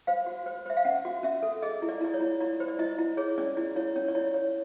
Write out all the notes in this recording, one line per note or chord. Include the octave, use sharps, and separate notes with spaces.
C5 F5
F#4
C5
C5 E5
F5
C#4 F#5
F#4
C#4 E5
A4
G#4 D#5
E4
D5
E4 D5
C#5
E4
E4 D5
C5
D5
E4 D#5
E4
G#4 C#5
C#4 D5
E4 D5
E4 C#5
C#4 C#5
D5
E4 C#5
C#5